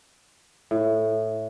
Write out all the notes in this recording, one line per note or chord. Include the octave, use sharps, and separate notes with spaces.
A2